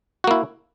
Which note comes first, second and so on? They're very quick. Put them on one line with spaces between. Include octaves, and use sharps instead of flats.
F#4 A#3 E4